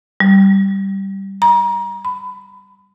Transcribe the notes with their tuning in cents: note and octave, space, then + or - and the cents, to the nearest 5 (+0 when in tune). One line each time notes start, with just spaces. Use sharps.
G3 -10
A#5 +35
B5 +20